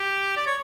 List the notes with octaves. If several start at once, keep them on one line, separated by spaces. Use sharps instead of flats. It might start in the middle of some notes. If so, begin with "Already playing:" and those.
Already playing: G4
D5
C#5